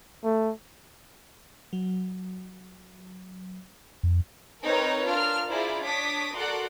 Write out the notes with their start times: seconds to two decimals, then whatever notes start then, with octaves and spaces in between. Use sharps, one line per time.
0.24 A3
1.73 F#3
4.03 F2
4.63 C4 D#4 A#4 B4 C#5 D#5
5.06 D4 F4 A#4 F6
5.48 E4 F4 G#4 C5 D5 A#5
5.83 D4 C#5 D6 D#6 B6
6.35 F#4 A4 A#4 D5 F#5 C6